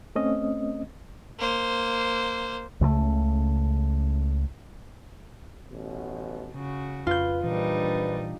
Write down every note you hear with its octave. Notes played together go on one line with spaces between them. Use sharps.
A3 C4 C#4 D#5
A#3 C5
C#2 C#3 F3 A3
A1 B2
C#3 F#4
F2 F4 B4 G6
A#1 A#2 E3 G3 D4 D#4 B4